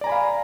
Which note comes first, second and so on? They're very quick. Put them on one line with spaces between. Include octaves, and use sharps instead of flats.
D5 A#5 G#5 B5 F5